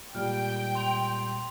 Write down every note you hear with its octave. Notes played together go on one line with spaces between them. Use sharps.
A#2 G3 G#3 G5 F6
C6 F7